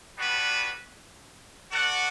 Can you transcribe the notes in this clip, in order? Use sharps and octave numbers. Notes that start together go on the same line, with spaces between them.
G3 B3 D4 F#4 B4
F#4 A4 D5 F#5